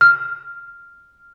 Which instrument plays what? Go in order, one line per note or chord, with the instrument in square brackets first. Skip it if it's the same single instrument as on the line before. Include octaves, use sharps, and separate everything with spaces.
[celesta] F6